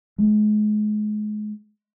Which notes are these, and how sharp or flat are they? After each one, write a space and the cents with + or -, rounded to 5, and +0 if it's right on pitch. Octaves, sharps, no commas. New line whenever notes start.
G#3 +35